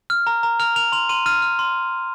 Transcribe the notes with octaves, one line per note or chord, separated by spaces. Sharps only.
F6
A#5
A#5
F6 F7
F6 F7
C6 F7
C6 D#7
F6 D#7
F6
C6